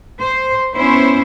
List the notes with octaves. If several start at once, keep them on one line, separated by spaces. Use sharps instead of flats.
C5
B3 C#4 E4 C5